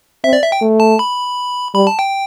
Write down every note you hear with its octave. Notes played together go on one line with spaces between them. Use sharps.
C4 E5
D5
E5
G5
A3
A5
B5
G3 B5
A5
G5